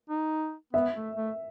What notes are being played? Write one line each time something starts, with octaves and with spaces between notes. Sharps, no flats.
D#4
B3 E5
A3
A3